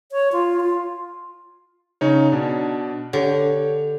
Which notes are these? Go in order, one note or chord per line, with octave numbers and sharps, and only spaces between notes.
C#5
F4
F4
C#3 D#4 C#5
B2 D4
D3 G4 C#5